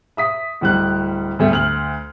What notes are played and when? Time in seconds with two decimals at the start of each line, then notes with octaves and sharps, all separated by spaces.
0.17 E5 D#6 B6
0.61 D1 G3 F#6
1.39 D2 G3 A3
1.52 D2 F6 F#7